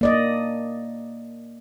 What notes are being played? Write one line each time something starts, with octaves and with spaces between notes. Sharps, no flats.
A#3 D5 D#5